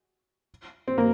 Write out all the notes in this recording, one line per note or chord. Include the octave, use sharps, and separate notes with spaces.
C4
A#3